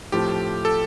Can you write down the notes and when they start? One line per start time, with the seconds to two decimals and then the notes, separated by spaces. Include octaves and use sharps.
0.12 A2 F3 A3 C4 G4
0.65 A4